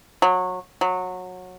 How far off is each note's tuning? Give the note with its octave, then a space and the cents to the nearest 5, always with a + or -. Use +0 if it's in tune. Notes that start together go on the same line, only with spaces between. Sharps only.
F#3 -20
F#3 -20